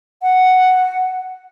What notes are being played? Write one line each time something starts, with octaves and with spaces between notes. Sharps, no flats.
F#5